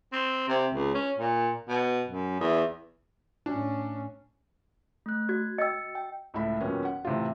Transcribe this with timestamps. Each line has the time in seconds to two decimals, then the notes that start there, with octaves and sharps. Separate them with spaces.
0.13 C4
0.48 C3
0.74 C#2
0.95 C#4
1.18 A#2
1.69 B2
2.08 F#2
2.40 E2
3.46 A2 C#4 D4
5.06 A3 F#6
5.29 F#4 G#6
5.58 D#5 G5 E6 A6 C#7
5.95 G5
6.34 C#2 A2 E4 A4 E5 B5
6.61 D#2 A#2 D#3 F#3 B3 C#4
6.85 F#5
7.05 A2 C3 E3 F4